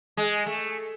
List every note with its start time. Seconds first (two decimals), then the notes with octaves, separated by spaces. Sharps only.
0.17 G#3
0.46 A3